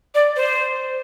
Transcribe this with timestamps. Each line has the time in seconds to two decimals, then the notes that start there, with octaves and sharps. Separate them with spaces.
0.15 D5
0.36 C5